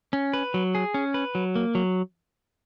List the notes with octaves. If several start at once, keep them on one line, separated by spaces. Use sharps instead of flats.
C#4
B4
F#3
G#4
C#4
B4
F#3
A#3
F#3